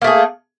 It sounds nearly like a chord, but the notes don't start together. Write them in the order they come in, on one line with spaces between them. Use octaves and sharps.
A#3 A3 G#4